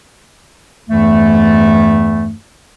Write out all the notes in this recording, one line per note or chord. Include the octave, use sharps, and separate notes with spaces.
E2 G2 E3 A3